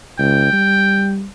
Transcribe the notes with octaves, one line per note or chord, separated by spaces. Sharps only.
C#2 G5
G3